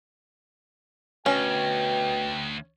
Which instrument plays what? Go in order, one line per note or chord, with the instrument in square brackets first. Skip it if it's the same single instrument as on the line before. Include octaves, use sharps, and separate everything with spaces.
[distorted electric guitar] D2 [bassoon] B2 [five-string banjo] C#4 [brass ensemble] G5